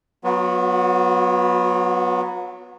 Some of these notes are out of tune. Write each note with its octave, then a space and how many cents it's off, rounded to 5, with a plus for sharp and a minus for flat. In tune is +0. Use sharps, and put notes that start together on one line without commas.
F#3 +0 B3 +0 F#4 -45